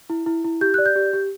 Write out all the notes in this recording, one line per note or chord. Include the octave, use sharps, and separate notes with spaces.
E4
E4
E4
G4 G6
D5 F#6
G6
G4
G4